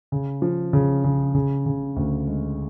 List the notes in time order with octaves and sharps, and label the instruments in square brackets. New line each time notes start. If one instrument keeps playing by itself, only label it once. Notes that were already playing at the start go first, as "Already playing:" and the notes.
[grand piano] C#3
F3
C#3
C#3
C#3
C#3
D2
G#3